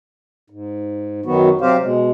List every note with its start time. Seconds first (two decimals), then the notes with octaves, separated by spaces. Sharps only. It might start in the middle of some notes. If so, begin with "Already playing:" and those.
0.50 G#2
1.26 F#2 D#3 F#3 B3 F#4
1.61 C3 F#3 C4 G4 C5 F5
1.82 B2 G#3